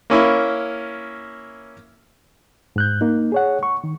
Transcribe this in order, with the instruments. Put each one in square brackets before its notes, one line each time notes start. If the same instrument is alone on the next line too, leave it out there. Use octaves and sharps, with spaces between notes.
[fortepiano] A#3 C#4 E4
[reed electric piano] G#2 F#6 G6
A#3 D#4
G#4 C#5 F#5
C#6
D#3